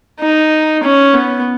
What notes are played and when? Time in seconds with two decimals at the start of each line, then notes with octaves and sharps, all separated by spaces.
0.20 D#4
0.83 C#4
1.14 B3